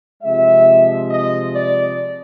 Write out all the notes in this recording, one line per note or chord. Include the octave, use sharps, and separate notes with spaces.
C3 F3 G#3 E5
D#5
D5